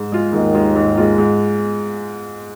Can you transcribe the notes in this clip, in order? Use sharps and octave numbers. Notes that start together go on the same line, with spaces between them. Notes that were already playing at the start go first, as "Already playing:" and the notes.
Already playing: G#2
G#3 F4
D#2 G#2 D#3
G#3 F4
G#2
G#3 F4
G#2